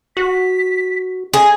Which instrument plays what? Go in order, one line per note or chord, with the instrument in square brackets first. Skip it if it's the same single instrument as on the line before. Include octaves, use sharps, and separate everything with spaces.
[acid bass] F#4 [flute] B6
[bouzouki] G#4 [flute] D#5